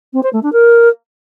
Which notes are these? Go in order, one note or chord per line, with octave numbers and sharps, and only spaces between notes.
C4
C5
A3
D4
A#4